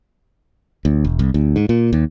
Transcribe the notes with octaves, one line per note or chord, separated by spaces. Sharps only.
D2
E1
C2
D2
G#2
A#2
D#2